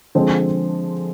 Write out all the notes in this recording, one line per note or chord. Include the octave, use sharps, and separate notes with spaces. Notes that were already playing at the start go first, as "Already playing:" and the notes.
D3 F3 G#3 C4